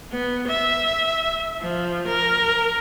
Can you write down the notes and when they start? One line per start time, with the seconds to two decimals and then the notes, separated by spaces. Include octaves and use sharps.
0.12 B3
0.47 E5
1.61 F3
2.07 A#4